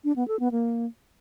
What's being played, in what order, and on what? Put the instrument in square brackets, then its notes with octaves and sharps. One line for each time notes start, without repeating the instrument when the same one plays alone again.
[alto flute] D4
B3
A4
B3
A#3